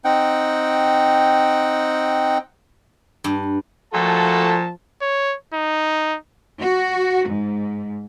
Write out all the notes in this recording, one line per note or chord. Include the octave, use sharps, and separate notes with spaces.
C4 D#4 F#5 G5
G2
A#2 F3 A3 F#4 A4 A5
C#5
D#4
F#4
G#2